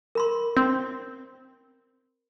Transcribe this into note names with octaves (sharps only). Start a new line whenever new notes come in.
A#4 B5 C6
C4